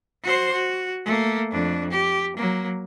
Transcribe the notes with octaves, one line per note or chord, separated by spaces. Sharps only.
F#4 C5
F#4
A3 A#3
F2 D4
G4
F#3 A#3